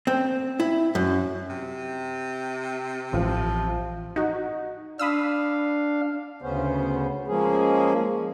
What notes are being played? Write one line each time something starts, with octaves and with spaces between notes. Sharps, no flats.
C4
E4
F#2
C3
A1 F3
D#4 F#4
D4 F5 B5 D#6 E6
D2 C#3 B3 C#4 C5
F3 G#3 A#3 C#4 G#4